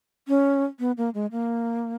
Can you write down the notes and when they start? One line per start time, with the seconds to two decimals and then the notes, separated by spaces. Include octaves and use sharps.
0.28 C#4
0.80 B3
0.97 A#3
1.14 G#3
1.32 A#3